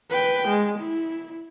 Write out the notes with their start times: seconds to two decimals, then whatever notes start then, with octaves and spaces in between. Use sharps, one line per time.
0.10 B4 G5
0.48 G#3
0.79 E4